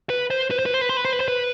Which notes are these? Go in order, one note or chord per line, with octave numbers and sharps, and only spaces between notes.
B4
C5
B4
C5
B4
C5
B4
C5
B4
C5
B4
C5
B4